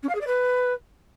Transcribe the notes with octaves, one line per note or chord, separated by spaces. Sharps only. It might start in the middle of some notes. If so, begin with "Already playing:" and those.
C#4
F5
G#4
D5
B4